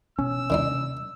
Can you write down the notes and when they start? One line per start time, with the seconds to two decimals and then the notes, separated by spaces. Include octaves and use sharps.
0.19 B2 B3 C#4 E6
0.50 D#2 C3 D#3 D4 D#4